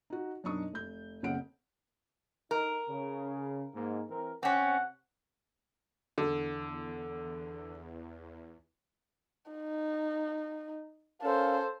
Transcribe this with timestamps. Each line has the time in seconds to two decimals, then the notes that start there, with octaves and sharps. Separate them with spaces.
0.10 D#4 F#4
0.44 F#2 B2 D4 D#4 C#6 D#6
0.73 F1 G6
1.23 F#1 B1 C#3 C4 F#5 D7
2.51 D#4 A#4
2.89 C#3
3.74 G#2 A#3
4.09 E3 C4 A#4
4.43 C3 C4 C#4 F#5
6.18 E2 D3
9.51 D#4
11.22 C#4 A4 A#4 C5 F5